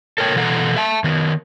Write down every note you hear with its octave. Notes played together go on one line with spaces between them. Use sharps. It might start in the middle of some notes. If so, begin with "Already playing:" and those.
A4 A#4 C#5 G5
B2 E3 A4 F#5 A#5
E5 A5
D#3 B3